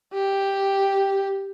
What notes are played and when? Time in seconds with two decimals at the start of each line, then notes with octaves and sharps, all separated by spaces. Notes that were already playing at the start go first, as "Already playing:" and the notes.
0.13 G4